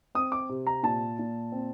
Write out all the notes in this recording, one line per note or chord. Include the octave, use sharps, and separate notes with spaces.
C4 D#6
D6
C3
A#5
A#2 A5
A#2
C4